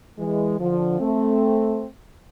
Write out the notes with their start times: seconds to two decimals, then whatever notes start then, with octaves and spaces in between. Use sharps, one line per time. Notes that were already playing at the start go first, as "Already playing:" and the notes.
0.18 E3 G#3
0.59 D3 F3
0.99 A3 C4